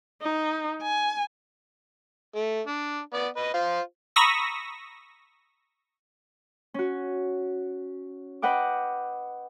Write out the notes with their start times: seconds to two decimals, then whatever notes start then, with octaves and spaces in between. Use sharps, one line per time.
0.22 D#4
0.82 G#5
2.35 A3
2.67 D4
3.13 B3 D5
3.36 B4 D#5
3.54 F4 C5
4.16 A#5 B5 C#6 D#6 E6 A#6
6.74 C#4 F#4
8.42 B4 D#5 F#5 G5 D6